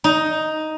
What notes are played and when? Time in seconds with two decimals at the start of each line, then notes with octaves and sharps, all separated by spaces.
0.04 D#4